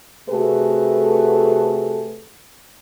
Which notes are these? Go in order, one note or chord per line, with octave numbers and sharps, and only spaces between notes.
C3 A3 F#4 G#4 A4 B4